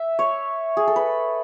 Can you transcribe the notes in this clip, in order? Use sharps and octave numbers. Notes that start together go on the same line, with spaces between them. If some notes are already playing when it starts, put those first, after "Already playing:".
Already playing: E5
C#5
G#4
A4
B4